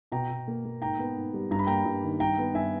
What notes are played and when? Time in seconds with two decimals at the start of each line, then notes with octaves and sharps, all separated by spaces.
0.12 B2 G5 A#5
0.30 B2
0.48 A#3
0.65 A#3
0.81 G#2 G5 A#5
0.99 B3
1.16 G#2
1.34 G3
1.51 G2 A#5
1.59 B5
1.67 A#3 G5 A#5
1.85 G2
2.04 D#3
2.20 G2 G5 A#5
2.38 B3
2.55 G2 E5 G#5